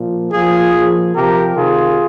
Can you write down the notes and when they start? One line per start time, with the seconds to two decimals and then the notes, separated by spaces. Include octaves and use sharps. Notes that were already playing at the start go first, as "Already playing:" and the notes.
Already playing: A#2 F3
0.31 A#2 F3 F4 G#4
0.73 A#2 F3
1.15 C3 F3 G4 A#4
1.56 C3 D#3 F4 G#4